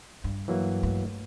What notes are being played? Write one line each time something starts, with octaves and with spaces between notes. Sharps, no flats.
G2
E3 F#3 A#3
G2 A3